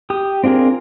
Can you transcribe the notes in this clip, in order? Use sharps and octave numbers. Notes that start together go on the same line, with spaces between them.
G4 D#6
C4 D4 F4 G#4 A#4